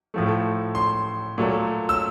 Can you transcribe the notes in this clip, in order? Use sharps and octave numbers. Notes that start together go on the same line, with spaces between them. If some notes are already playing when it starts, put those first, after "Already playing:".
A2 F3 A3
C6
A#2 F#3 A3
E6